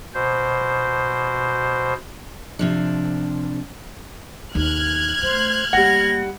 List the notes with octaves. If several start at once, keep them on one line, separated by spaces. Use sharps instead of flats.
B2 C5
C3 F3 D4
D#2 C4 F6 F#6 G#6
A3 C5
G3 A#3 F#5 A#6